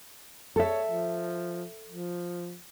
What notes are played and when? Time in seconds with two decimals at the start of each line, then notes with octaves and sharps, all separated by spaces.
0.56 A4 C#5 E5
0.89 F3
1.89 F3